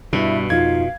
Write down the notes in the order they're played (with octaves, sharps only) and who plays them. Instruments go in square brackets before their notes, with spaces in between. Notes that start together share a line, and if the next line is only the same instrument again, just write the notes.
[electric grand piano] G2 [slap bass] B2 [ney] E4
[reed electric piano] F2 D#4 F4 [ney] F5 [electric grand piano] G#6